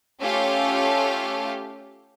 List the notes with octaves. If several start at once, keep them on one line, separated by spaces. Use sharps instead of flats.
A3 C#4 F4 G4 A4 F5